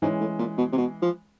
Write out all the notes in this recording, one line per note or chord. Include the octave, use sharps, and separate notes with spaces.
G#2 E3 G#3 C#4
A2
A#2
B2
C3
B2
F3